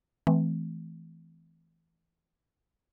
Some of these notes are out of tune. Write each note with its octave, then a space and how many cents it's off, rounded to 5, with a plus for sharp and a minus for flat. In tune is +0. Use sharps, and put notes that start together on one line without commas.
E3 +0 A3 -25 C4 -25